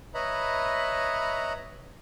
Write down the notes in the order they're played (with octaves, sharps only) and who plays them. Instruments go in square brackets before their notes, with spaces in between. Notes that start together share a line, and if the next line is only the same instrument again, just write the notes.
[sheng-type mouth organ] B4 C#5 D#5 E5 A#5 B5